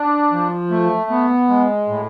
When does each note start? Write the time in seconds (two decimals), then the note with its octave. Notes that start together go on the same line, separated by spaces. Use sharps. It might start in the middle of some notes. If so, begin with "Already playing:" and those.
Already playing: D4
0.32 F3
0.71 A3
1.10 B3
1.49 G#3
1.88 A2